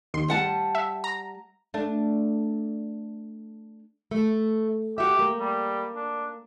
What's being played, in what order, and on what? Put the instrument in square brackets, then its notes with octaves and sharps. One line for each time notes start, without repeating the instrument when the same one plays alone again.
[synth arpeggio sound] D#2 C6
[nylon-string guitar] G3 F#5 A5
[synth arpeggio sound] E5
A#5
[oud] A3 D4
[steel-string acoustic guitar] A3
[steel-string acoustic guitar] F#4 E5 [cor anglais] G4
[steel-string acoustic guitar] A#3
[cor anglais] G3
D4